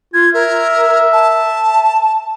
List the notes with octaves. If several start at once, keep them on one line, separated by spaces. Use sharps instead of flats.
F4 G#6
A#4 E5
A5